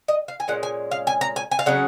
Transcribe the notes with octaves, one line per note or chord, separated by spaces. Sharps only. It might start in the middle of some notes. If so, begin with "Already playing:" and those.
D#5
F5
G#5
A#2 G#3 C#4 F#5
G#5
F5
G#5
A#5
G#5
G#5
F5
C#3 F#3 C#4 F#5